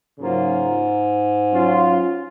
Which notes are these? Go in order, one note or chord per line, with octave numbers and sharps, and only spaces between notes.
G#2 C#3 F#3 A#3 F4 A#4
F#3 C#4 F4